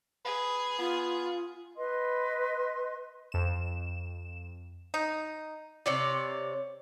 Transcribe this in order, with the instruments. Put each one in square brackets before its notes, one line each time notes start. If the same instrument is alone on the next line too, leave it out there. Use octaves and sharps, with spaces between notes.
[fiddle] G#4 [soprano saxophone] B4
[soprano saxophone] B3 [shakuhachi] F4
[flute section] B4 D#5 C6
[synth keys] F2 E7
[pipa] D#4
[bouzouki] C3 C#5 D5